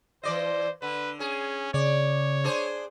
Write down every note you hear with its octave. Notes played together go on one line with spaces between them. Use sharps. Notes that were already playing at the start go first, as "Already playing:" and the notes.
E3 C5 D5 D#5
D3 B4
C#4 G#4
C#3 C#5 D5
D4 G#4 C5